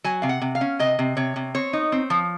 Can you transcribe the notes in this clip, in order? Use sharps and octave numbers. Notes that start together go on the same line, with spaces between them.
F#3 G#5
C3 F5
F#5
C3
F5
C#4
C3 D#5
C3
C3 C#5
C3
C4 C#5
D#4
C4
F3